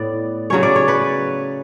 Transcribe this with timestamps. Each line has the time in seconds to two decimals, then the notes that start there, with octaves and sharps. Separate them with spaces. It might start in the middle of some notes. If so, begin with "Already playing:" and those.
Already playing: A2 B3 D5
0.50 C#3 F#3 C#4 C#5
0.63 D5
0.76 C#5
0.88 B4